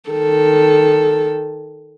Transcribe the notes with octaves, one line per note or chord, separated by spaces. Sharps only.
D#3 A4